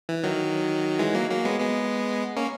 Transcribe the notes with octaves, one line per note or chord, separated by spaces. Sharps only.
E3
D#3 F#3
E3 G#3
F#3 A#3
F#3 A#3
G#3 B3
G#3 B3
A#3 C#4